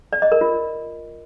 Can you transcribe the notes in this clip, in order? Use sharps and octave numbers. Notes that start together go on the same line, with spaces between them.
D5
D#5
A#4
F4